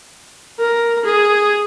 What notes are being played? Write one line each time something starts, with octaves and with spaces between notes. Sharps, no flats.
A#4
G#4